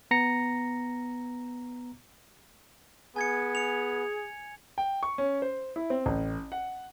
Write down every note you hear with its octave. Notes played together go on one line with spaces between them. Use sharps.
B3 A#5 A#6 C#7
B3 G#4 G#5 G#6 C#7
C#7 F7
G5
C#6
C#4
C5
E4
C4
A1
F#5